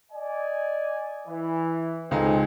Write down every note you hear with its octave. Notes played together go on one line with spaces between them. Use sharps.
D5 D#5 G#5
E3
C#2 C4 D#4 G#4 A4